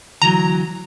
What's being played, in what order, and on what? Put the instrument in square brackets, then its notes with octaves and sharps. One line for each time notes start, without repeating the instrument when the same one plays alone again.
[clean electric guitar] D2 E3 F#3 [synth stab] A#5